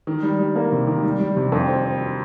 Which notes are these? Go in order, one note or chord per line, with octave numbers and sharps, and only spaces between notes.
D#3
G3
G3
A#3
C3
D#3
G3
G3
C3
F2
C4
C4